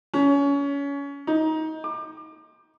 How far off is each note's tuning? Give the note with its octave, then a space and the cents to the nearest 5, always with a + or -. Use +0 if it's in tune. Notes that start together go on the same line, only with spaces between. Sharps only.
C#4 +25
D#4 +20
D6 +35